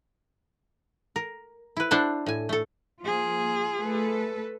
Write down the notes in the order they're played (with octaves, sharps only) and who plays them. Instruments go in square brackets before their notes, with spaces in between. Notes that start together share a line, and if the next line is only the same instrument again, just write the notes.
[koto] A#4
E4 B4
D4 E4 C5 F#5 A5
A2 G#5
A3 A4
[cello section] F3 A#3 [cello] F4 G#4
[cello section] A3 A4 B4